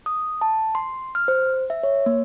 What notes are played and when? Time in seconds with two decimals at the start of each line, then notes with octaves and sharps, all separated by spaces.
0.06 D#6
0.41 A5
0.75 C6
1.15 F6
1.28 C5
1.70 E5
1.83 C#5
2.06 A#3